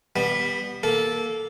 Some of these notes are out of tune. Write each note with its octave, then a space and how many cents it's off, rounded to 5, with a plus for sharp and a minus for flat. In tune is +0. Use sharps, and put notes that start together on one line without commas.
G3 +15 B3 -15
A#3 +5 A4 -10